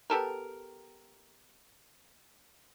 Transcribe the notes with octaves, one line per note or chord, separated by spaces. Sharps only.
B3 G4 A4 A#4